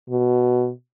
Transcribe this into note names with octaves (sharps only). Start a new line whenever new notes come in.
B2